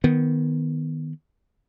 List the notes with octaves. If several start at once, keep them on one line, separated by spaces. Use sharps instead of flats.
D#3 B3